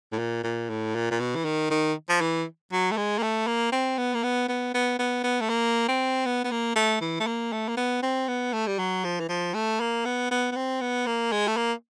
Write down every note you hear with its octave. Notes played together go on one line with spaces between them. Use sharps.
A2
A#2
A#2
A2
A#2
A#2
B2
E3
D#3
D#3
F3
E3
F#3
A3
G#3
A#3
A3
A#3
C4
B3
A#3
B3
B3
B3
B3
B3
A3
A#3
C4
B3
B3
A#3
A3
E3
A3
A#3
A3
A#3
B3
C4
B3
A3
G3
F#3
F3
E3
F3
A3
A#3
B3
B3
B3
C4
B3
A#3
G#3
A3
A#3